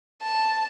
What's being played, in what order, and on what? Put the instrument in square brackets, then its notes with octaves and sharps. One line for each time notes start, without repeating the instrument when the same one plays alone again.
[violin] A5